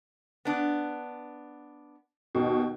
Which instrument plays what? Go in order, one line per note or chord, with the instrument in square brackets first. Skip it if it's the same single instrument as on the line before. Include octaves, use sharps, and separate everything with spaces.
[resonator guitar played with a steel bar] B3 D4
[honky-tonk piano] D#2 B2